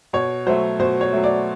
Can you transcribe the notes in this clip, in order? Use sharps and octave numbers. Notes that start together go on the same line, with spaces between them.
B2 C#5
F#3 A3 C5
B2 C5
C#5
F#3 A3
D5